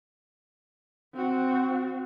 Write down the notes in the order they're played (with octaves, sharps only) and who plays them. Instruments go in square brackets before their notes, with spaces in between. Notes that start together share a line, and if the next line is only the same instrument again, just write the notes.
[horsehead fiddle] C4 F#4